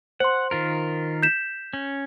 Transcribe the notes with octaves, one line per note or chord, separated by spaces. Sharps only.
C5 F#5 C6
D#3 F4 A#4
G6 B6 E7
C#4